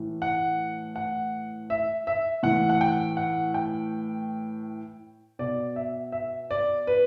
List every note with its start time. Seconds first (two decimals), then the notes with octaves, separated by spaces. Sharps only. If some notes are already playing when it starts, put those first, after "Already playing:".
Already playing: A2 E3
0.22 F#5
0.96 F#5
1.70 E5
2.07 E5
2.43 A2 E3 F#5
2.69 F#5
2.81 G5
3.17 F#5
3.54 G5
5.39 B2 D5
5.76 E5
6.12 E5
6.51 D5
6.87 B4